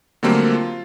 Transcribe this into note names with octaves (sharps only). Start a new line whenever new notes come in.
D3 F#3 G3 A3 A#3 C4
F4